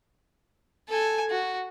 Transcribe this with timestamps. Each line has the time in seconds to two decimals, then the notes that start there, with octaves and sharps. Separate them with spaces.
0.89 A4 G#5
1.30 F#4